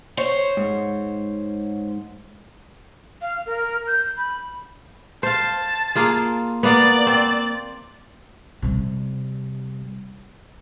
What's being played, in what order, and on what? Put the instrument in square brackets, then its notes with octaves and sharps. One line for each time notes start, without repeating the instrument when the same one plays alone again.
[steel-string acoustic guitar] C5 C#5
[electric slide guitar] G#2
[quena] F5
A#4
G6
B5
[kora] C5 F5 [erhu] A5
[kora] A#3 F4 G#4
[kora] A#3 B3 [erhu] D5
[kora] C4
[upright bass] C3 G3